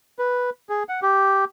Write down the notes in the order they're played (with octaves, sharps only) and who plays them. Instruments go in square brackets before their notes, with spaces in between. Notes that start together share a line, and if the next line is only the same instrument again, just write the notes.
[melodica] B4
G#4
F#5
G4